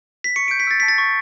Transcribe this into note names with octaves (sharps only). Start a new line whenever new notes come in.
B6
C#6 C#7
G6 D7
B6
E6 A6
A5 B6
A6
C#6